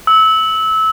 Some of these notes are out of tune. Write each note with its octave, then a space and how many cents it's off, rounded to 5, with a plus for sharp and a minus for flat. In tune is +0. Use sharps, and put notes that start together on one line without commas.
E6 -25